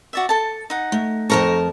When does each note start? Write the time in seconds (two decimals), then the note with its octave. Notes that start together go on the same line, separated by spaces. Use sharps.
0.13 F#4 D5 E5
0.29 A4 A5
0.70 D#4 F#5
0.92 A3
1.30 F2 D#4 A#4 A5 A#5 C#6